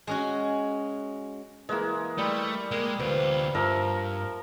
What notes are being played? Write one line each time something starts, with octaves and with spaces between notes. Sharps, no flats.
G#3 C#4 F#4
E3 G#3 A#3 E4
G3 A3
G#3 A#3 G#4
D2 B3 C4 F4
G2 F3 A#4 E5